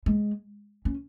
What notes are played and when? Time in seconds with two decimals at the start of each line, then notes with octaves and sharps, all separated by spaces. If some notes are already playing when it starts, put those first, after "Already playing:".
0.06 G#3
0.85 C#4